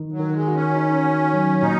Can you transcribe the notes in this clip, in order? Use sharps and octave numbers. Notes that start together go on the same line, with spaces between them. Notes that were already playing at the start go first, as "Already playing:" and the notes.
Already playing: D#3 D#4
F#3
D#3
G#3
F#4
C#4
D#4
F#4
F#3
A#2 D#4